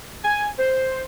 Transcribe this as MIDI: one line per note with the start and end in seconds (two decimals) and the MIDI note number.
0.25 0.49 80
0.59 1.03 72